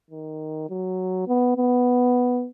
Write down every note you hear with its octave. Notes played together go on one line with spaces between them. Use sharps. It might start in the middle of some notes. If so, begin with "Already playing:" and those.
D#3
F#3
B3
B3